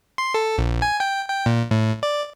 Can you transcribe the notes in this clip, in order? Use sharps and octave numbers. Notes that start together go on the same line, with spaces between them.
C6
A4
A#1
G#5
G5
G5
A#2
A2
D5